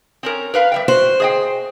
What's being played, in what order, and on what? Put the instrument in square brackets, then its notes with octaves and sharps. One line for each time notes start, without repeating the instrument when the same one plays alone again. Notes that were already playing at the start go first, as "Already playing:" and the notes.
[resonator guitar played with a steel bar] C4 C#4 A#4
A#4 B4 F5
G3 E5 G5
[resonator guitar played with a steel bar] F#4 [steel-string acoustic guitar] C5
[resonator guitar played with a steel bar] G#4 D#5 G5